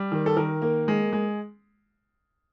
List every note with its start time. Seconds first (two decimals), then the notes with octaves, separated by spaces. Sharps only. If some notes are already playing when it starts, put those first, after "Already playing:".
Already playing: G3
0.12 D#3
0.26 A4
0.37 D#3 A#4
0.62 A#3
0.88 G#3
1.13 G#3